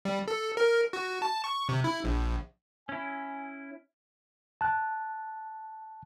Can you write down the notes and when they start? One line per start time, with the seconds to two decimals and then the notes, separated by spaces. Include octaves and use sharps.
0.05 G3
0.28 A4
0.57 A#4
0.93 F#4
1.22 A5
1.44 C#6
1.69 C3
1.84 E4
2.04 A#1
2.89 C#4 E4 G#5
4.61 A5 F#6